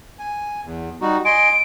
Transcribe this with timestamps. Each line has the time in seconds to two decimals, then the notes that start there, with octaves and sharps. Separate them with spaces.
0.19 G#5
0.64 E2
1.01 G3 D#4 F#4
1.25 D#5 G#5 C6 D7